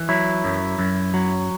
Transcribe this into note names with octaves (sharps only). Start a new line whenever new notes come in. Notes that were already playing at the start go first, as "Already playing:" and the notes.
Already playing: E3
F#3 E4
F#2
F#2
F#3